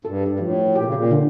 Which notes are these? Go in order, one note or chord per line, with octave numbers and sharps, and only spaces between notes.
G2 A4
G2
A2 F3
A#2 G4
C#3
A#2
D3